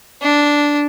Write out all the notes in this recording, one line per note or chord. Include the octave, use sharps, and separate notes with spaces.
D4